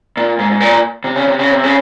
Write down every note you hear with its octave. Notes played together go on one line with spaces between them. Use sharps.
A#2
G#2
G#2
A#2
C3
C#3
C3
C#3
C3
C#3